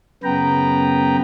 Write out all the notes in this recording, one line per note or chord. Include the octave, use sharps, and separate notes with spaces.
F#2 C#3 B3 B4 G5 A#5